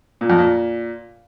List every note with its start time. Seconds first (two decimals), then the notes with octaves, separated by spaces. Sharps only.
0.21 A#2
0.30 F2
0.38 A#2